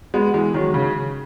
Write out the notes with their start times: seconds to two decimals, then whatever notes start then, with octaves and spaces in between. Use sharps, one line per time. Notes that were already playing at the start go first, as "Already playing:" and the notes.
0.14 G#3 B3
0.34 E3 G#3
0.54 D#3 F#3
0.74 C#3